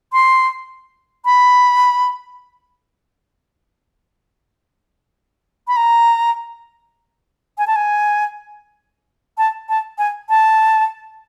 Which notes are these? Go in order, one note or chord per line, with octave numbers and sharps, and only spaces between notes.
C6
B5
B5
A#5
G#5
A5
G#5
A5
A5
G#5
A5